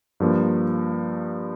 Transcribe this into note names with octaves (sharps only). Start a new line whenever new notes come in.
G2 F3 A#3